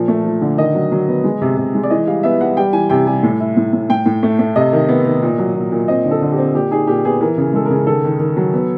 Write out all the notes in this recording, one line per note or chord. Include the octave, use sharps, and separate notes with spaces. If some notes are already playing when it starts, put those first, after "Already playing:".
Already playing: A#2 F3
A3
F3
D3
D#3 D#5
F#3
F#3
B3
G#3
C3
C3
G#3
D5
E3 D#5
G3 F5
B3 E5
G3 F#5
G3 G5
E3 G#5
C3 G5
G3 G#5
A2
E4
A2
A2
A2 G5
A2
A3
A3
C3 D#5
D#3
B3
D#3
A#2
F#3
A#2
A#2
C4 D#5
D3
A4
D3
G4
C4
A#2 G4
D#4 G#4
A#2 G4
B3 G#4
E3 A#4
C#3
G#3 A4
C#3 A#4
D#3 A4
D#3
D#3
F#3
B3